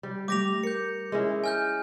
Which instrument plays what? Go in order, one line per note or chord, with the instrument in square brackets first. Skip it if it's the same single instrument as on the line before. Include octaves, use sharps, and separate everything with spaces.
[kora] G3
[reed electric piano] G3 A3 [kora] G4 [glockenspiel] D6 A#6 F7
[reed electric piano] A#4 [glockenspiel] G6 C#7
[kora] G#3 C#4 E4
[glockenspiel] G#5 F6 G6